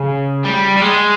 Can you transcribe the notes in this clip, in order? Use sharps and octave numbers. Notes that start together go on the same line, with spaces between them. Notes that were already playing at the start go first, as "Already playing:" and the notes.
Already playing: C#3
G3
G3
G#3